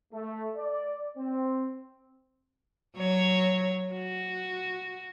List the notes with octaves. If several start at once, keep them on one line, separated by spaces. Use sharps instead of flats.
A3
D5
C4
F#3 C#5
F#4